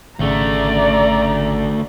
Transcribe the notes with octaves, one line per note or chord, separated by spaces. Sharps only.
G#1 D2 C#3 A3 D5 A#5